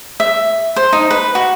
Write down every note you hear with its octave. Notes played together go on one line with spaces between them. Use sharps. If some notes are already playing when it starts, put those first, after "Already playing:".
E5
C5
D#4
B4
F#4